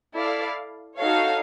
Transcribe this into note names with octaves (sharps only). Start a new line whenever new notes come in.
E4 A4 D5 F5
D#4 F#4 A4 C#5 F5